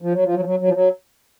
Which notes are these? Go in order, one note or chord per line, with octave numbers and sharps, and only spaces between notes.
F3
F#3
F3
F#3
F3
F#3
F#3
F3
F#3